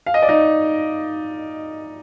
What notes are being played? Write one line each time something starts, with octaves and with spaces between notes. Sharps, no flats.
F5
D#5
D5
D#4 D#5